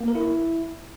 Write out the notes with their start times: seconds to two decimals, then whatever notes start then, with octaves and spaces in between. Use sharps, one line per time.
0.01 A#3
0.08 A#4
0.15 E4